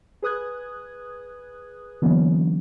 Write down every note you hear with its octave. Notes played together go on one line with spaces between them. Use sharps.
G#4 B4 D#6 F#6 G#6
D3 E3 F#3 A#3 B3 C#4